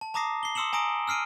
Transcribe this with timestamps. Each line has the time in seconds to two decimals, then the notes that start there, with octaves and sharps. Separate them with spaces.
0.01 A5
0.14 A5 A#5 D6 D#6 A#6 C7
0.43 C7 G7
0.55 C6 D#6 E6 C#7 E7 F#7
0.73 G#5 A#5 D#6 A#6 D7
1.07 E6 F6 C7 D7 D#7